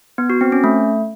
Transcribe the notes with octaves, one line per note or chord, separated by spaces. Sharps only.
B3
F#4
C4
C#4
A3